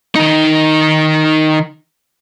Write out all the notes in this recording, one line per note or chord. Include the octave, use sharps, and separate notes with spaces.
D#3 D#4